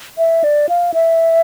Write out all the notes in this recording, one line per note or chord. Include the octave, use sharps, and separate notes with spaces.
E5
D5
F5
E5